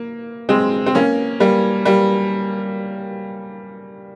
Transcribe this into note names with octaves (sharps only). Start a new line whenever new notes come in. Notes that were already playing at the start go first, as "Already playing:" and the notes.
Already playing: A#3
G#3 C4
C4
A#3 C#4
G3 A#3
G3 A#3